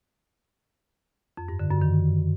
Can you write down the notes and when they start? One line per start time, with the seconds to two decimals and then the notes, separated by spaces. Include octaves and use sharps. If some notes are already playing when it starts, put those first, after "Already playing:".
1.38 F2
1.49 G2
1.60 D3
1.71 F#2
1.82 D#3